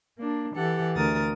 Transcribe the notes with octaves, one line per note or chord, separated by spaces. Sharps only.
A#3 D4
E3 G4 A4 F#5
D2 A#4 D#6 A6